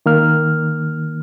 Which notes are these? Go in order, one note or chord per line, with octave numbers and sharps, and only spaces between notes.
D#3 A#3 F6